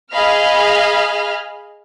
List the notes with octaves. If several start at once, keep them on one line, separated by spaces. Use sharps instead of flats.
G#4 D#5 F5 B5 F6